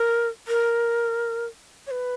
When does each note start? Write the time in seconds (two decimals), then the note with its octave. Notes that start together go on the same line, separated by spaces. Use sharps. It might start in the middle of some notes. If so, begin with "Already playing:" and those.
Already playing: A#4
0.48 A#4
1.87 C#5
1.91 B4